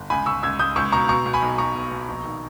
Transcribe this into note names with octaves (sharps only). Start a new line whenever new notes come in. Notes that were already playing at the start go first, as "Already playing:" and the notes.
Already playing: G1
C#2 G#5 B5
C#2 C#6 E6
C#2 E6 G#6
C#2 D#6 G6
C#2 C#6 E6
B2 A#5 C#6
B2 A#5 C#6
B2
G#5 B5
B1
B1 A#5 C#6
B2
B2
A#1
D#3